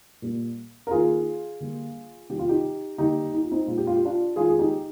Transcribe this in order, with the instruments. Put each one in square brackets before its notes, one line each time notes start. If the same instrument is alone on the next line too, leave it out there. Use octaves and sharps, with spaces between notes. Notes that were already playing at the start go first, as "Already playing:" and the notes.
[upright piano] A#2 G3 A#3
A#4
D#3 A#3 F4 G#4
D3 G3 A#3
C3 D#3 G3 G4
F4
D#4 G4
D3 G3 A#3 D#4 G4
D#4
F4
C4 D#4
A#2 G#3 F4
G4
F4
G4
D4 F4
D#3 G#3 F4 G#4
G#4
D#4 G4